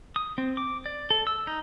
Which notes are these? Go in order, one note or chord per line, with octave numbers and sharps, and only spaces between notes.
D#6
C4
D6
D5
A4
E6
D#4